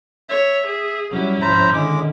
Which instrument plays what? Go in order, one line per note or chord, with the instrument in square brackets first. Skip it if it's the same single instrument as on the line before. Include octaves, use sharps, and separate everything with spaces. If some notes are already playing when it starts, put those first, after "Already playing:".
[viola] C#5 [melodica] E5
[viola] G#4
[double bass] F#3 G3 [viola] C#4 E4
[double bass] G#2 F3 [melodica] C5 A#5 B5
[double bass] D3 D#3 [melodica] G#3 D6